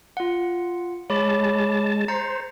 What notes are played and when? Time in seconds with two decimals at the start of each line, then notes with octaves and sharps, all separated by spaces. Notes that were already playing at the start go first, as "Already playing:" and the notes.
0.17 F4 F#5
1.10 G#3 C#5 A5 B5 D6
2.08 C5 A#5 A6 C#7